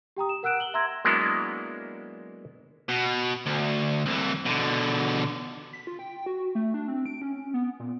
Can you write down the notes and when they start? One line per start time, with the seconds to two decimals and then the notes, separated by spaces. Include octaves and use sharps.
0.17 G4 G5 A#5 D#6
0.29 E7
0.43 A#4 F#5 E6 F#6 D7 E7
0.60 F#7 G7
0.74 E5 A#5 C6 E6 G#6 A#6
1.05 F#3 G#3 A#3 B3 D4 E4
2.89 B2
3.46 D2
4.06 C2 E3
4.45 B2 D3
5.73 B6
5.87 F4
5.99 G5
6.26 F#4
6.55 A3
6.74 D4
6.88 C4
7.06 D7
7.22 C#4
7.54 B3
7.80 A#2